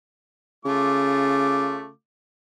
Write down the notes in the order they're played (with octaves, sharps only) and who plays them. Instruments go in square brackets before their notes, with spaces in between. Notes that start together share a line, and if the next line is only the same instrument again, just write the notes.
[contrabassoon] C#3 [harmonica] A3 F4 D6